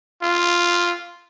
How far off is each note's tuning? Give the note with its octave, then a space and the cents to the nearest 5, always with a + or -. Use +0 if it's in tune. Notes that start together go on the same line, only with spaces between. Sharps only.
F4 +0